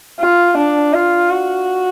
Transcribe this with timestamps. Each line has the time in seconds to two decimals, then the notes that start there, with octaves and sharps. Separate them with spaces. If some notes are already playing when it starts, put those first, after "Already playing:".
0.20 F4
0.58 D4
0.94 F4
1.30 F#4